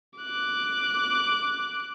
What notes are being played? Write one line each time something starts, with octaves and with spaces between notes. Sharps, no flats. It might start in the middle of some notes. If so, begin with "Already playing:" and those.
D6 F#6